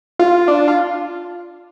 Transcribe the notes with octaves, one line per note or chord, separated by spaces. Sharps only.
F4
D4
F4